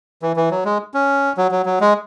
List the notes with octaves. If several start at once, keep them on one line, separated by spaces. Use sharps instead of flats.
E3
E3
F#3
G#3
C#4
F#3
F#3
F#3
G#3